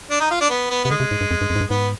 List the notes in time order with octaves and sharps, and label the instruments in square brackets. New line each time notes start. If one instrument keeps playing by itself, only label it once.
[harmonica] D4
D#4
F4
D4
B3
B3
[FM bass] C3 [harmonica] B3
[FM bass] D3 [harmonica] G#3
[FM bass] C3
G#2
G2
F2
G2
F2
G#2
G2
[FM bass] G#2 [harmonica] B3